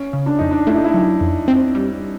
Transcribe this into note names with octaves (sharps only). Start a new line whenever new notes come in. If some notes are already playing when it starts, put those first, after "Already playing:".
Already playing: C#4
C#3
D4
F2 D#4
D4
A3 E4
D#4
E4
F#3
F2
C4
G3